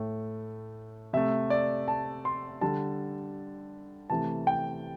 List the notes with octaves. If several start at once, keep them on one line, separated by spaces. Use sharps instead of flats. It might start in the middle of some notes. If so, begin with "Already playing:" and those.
Already playing: A2 A3
C3 A3 E5
D5
A5
C6
D3 G3 A5
C3 E3 A3 A5
G5